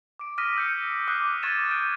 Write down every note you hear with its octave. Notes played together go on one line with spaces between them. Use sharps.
D6 D7
D6 D#6 F6 A#6 B6 D#7
E6 G6 C#7
D6 D#6 F6 F#6 C7
C#6 G#6 A6 D#7 E7
F#6 G6 A6 D7 D#7